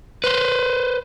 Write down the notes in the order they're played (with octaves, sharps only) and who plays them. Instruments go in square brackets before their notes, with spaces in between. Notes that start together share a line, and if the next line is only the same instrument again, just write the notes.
[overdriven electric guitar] B4 C5